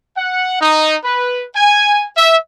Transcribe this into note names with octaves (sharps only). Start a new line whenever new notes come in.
F#5
D#4
B4
G#5
E5